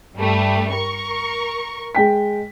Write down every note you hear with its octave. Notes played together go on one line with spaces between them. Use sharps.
G2 G3 A3
A#4 C#6
G#3 G5 B6